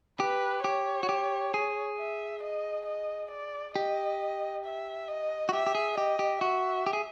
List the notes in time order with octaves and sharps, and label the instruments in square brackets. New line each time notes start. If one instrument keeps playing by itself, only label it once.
[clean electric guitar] G4 [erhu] B4
[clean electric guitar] G4 [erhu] C#5
[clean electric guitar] F#4
G4
G#4
[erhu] E5
D#5
D#5
D5
[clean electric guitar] G4 [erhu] D#5
[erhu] E5
D#5
[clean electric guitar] F#4
[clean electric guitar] G4 [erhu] E5
[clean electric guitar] G4
G#4
[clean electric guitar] G4 [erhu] D#5
[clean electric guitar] G4
[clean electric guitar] F#4 [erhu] E5
[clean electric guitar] G4
G#4